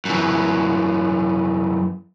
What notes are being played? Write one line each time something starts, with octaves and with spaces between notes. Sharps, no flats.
F#2 E3